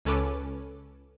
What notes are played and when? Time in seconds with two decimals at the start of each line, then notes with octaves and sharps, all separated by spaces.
0.05 C#2 C#4 A4 B4 D6